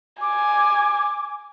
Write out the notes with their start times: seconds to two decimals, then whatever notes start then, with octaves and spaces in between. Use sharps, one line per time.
0.21 G#5 D6